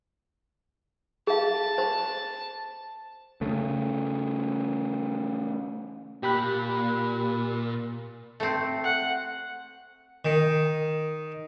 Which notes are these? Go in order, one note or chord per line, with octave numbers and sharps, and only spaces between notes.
G#4 F5 A5
C5
C#3 A3
A#2 G4 B5 F#6
A3 C4
F#5
D#3